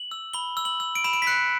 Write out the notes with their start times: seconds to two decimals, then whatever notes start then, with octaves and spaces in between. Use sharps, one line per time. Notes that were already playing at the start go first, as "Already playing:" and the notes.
Already playing: F#7
0.11 E6
0.34 B5 G7
0.57 E6
0.65 F#7
0.80 E6
0.95 D7
1.04 B5 E7
1.13 D7
1.22 B6
1.27 F#6 C#7